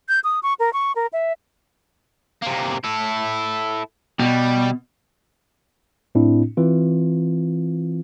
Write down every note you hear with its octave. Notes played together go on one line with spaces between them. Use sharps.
G6
D#6
C#6
A#4
C#6
A#4
E5
C3 A#3
E4 A4
B2 G3
A2 C4 D4 E4
E3 C4 F4